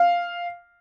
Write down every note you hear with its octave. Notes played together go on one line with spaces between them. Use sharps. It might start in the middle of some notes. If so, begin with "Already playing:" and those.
Already playing: F5